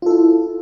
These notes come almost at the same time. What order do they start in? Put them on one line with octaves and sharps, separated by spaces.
F4 A4 E4